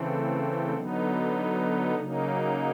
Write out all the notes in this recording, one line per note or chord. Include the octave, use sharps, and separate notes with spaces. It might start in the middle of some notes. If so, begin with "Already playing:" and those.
Already playing: C#3 E3 A3 C4
D3 F#3 B3 D#4
C#3 F#3 A#3 D#4